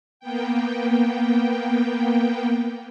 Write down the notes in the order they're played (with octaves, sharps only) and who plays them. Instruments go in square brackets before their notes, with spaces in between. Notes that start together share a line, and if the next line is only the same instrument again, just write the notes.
[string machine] A#3 B3 G5